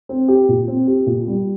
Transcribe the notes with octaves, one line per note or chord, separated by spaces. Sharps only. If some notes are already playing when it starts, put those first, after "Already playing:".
C4
G4
A#2
C4
G4
A#2
G3